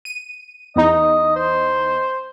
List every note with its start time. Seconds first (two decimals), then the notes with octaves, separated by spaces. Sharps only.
0.05 D#7
0.76 E2 D#4 D#5
1.36 C5